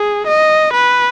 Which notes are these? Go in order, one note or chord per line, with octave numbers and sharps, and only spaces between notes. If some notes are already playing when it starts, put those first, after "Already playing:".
Already playing: G#4
D#5
B4